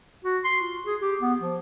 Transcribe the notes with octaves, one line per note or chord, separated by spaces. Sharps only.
F#4
C6
F4
G#4
G4
B3
F3